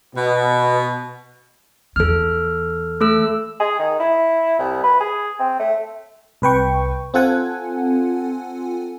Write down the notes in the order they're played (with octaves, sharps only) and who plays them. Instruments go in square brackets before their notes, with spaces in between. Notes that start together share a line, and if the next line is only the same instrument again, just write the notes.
[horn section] B2
[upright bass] E2 E3 [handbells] A4 F6
[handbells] A3 A4 E6
[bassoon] G#4
D#3
E4
C2
B4
G#4
C4
A3
[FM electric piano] C2 B4 G5 C#6
C4 F4 A4 F#5 G#5